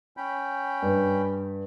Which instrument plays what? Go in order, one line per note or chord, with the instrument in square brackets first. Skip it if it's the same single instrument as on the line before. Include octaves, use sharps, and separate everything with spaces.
[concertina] C#4 G5 B5
[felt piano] G2